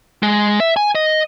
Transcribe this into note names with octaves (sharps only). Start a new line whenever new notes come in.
G#3
E5
G#5
D#5